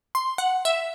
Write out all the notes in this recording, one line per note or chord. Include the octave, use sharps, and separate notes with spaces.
C6
F#5
E5